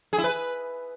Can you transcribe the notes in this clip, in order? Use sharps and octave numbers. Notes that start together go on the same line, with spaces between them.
G#4
E4
B4